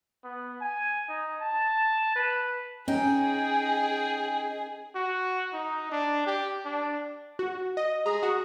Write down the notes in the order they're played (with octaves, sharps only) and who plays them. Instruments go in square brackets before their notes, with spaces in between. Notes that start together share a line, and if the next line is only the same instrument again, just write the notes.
[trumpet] B3
G#5
D#4
A5
B4
[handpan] C#4 [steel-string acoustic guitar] D#4 [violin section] G#4 [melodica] G5
[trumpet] F#4
D#4
D4
G4
D4
[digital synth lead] F#4
D#5
[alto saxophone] G#4 [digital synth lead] A#5
[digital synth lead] F#4